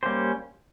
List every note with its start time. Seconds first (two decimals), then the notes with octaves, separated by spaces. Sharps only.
0.03 G3 A#3 C#4 G4 C5